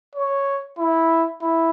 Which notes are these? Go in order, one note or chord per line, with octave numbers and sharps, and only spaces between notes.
C#5
E4
E4